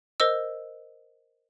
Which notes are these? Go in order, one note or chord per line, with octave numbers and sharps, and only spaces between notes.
A#4 C5 D#5 E6